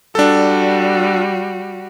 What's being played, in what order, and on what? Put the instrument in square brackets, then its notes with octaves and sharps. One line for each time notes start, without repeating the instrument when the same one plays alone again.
[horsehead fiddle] G3 F#4 [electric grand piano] D4 A4